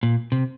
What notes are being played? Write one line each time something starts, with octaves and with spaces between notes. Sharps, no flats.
A#2
C3